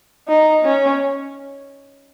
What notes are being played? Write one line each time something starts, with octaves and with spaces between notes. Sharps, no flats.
D#4
C#4